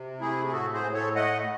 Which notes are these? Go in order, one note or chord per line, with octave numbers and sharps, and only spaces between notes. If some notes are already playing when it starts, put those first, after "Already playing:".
Already playing: C3
A3 E4 G#4
G#4
A2 F#4 A4
G#4 C5
A2
A4 C#5
A3 D#5 F#5